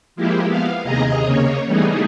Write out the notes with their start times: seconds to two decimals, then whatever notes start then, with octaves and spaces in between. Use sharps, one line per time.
0.16 F3 G#3 A#3 E4 G4
0.46 B3 F5
0.84 D#2 C3 G#4 D#5 A#5
1.22 C#3 A#3 C#5
1.65 E3 G3 A3 B3 D#4 G#4